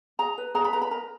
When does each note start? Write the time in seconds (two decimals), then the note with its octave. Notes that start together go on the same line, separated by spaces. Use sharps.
0.19 G#4 A#5
0.38 B4
0.54 G#4 A#5
0.64 B5
0.73 B4 A#5
0.81 B5
0.91 A#4 A#5